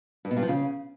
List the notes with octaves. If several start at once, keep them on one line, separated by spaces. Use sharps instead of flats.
G2
B2
G2
F3
C#3